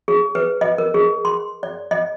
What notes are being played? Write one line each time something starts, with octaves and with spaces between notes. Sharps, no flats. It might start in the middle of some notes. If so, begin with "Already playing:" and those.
G#4
B4
D#5
A#4
G#4
C6
D5
D#5